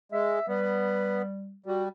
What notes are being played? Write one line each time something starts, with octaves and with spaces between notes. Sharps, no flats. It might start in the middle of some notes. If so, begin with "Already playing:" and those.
G#3 E5
G3 B3
G3 F#4